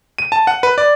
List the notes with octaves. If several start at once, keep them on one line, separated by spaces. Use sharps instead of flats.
D#7
A5
F#5
B4
D5